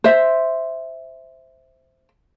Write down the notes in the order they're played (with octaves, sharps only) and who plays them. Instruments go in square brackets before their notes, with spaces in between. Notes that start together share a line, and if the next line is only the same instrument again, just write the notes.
[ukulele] C5 E5